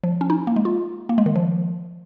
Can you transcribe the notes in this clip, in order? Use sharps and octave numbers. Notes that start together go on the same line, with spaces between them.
F3
C#4
D#4
A#3
G#3
F4
A#3
G#3
D#3
F3